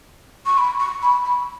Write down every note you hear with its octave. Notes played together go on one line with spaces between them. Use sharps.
C#6
B5
C#6
B5
B5